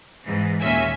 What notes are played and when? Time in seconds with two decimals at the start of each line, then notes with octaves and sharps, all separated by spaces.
0.24 G#2 E3
0.60 D#2 A#2 G#3 C#4 E5 G#5